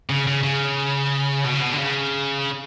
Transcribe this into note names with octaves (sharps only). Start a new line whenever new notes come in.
C#3
C#3
C#3
B2
C#3
B2
D3
C#3